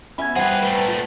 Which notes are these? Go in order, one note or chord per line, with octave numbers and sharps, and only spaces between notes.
B3 C#4 E5 B5 G#6
G3 G#4 B4 C5 F#5 G5
A#2 A3 B4
F4 A6